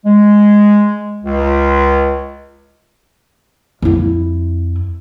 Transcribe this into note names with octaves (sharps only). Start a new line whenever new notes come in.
G#3
C#2
F2 E4